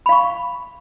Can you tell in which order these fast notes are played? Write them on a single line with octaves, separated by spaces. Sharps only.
B5 F5 C#6